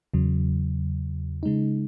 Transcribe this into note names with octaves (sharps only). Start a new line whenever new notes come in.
E2 C#3 F#3
C#3 G#3 D#4